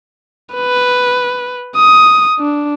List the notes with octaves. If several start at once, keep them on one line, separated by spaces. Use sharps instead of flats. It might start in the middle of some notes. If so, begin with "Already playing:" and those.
B4
D#6
D4